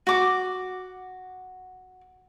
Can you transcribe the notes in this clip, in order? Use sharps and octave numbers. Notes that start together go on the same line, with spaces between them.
F#4 D6